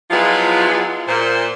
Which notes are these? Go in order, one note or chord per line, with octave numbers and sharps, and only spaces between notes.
F3 F#3 G#3 B3 E4 F4
A#2 C5